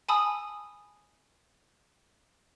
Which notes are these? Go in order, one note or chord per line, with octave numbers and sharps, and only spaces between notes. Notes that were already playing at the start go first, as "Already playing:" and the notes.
G#5 A5 B5 D#6 E6